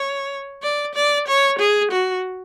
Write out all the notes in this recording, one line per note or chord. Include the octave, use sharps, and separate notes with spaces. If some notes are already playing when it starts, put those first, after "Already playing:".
Already playing: C#5
D5
D5
C#5
G#4
F#4